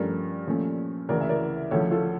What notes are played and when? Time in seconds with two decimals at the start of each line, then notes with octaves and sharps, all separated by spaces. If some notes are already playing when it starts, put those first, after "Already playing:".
Already playing: G2 F3 A3 C#4 A#4 D5
0.46 A#2 F3 A3 C#4
1.09 D2 C#3 E3 A#4 D5
1.21 E5
1.29 A#4 D5
1.71 D2 C#3 F3 A4 C#5
1.91 F4 A4